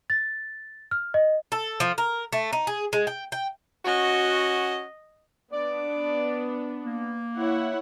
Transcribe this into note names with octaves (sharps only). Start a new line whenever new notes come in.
A6
F6
D#5
A4
F3
A#4
A3
D#4
G#4
G#3
G5
G5
C#4 F#4 D#5
B3 D4 D5
A#3
E4 C#5 F#5